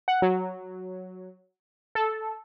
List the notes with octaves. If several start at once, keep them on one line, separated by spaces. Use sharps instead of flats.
F#5
F#3
A4